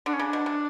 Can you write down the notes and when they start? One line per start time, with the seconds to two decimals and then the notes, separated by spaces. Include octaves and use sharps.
0.06 D3 D4
0.13 C#4
0.19 C#3 D4
0.33 B2
0.46 C3